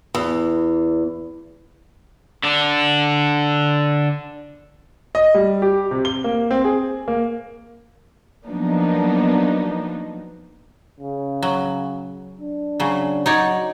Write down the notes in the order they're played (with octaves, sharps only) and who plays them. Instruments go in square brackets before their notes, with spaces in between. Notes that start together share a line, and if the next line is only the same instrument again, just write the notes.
[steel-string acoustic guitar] E2
[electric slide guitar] D3 D4
[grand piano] D#5
G3
G4
C3
G7
A#3
C4
G#4
A#3
[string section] F3 F#3 A#3 B3 D4 D#4
[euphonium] C#3
[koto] F#3
[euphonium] D4
[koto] C#3 F#3
[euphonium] F#3 [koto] D#4 C#5 D5